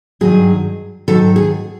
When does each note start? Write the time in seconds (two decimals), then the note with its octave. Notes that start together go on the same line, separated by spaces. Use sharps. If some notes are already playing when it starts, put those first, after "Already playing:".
0.21 G2 D#3 F#3 G#4
1.08 G#2 D#3 F#3 A4
1.36 G#4